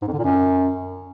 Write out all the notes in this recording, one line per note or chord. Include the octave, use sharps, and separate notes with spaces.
G#2
F2
D3
A#2
F#2